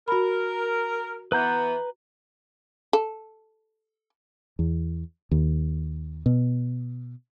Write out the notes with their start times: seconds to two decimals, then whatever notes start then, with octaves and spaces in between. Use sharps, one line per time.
0.08 F#4 A#4 B5
1.32 E3 B3 B4 A#5 G6
2.93 A4
4.59 E2
5.31 D#2
6.26 B2